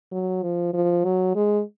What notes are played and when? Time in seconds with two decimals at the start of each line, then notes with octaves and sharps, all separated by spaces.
0.12 F#3
0.43 F3
0.73 F3
1.04 F#3
1.35 G#3